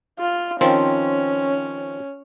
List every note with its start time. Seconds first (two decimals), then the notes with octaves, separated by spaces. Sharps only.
0.19 F4
0.61 D#3 F3 C4 C#4